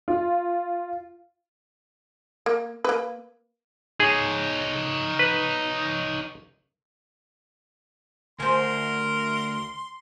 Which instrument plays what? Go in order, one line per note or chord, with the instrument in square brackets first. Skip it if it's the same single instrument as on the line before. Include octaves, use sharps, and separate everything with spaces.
[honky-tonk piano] F4
[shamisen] A#3
A#3 B4
[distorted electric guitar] D#4 C#5 [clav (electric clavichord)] G#4
[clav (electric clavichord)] B4
[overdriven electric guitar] D2 [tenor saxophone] A#4 [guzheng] C5 G#5 [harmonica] C6